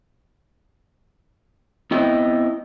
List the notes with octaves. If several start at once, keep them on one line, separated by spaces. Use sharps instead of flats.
B3 C4 E4 D#5 G5